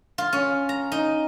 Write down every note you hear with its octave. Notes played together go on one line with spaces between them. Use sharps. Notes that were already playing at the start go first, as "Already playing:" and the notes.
F4
C#4
A#5
D#4